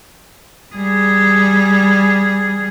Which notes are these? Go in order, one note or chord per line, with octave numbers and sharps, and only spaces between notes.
G3 G#4